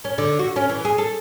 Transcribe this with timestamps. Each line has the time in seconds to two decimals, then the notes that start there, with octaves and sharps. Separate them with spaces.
0.04 C#4
0.18 D3
0.39 F#4
0.56 C#4
0.69 E3
0.85 G#4
0.98 A4